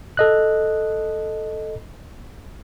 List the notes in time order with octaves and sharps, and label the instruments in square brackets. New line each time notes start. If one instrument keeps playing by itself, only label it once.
[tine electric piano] A4 D#5 F#6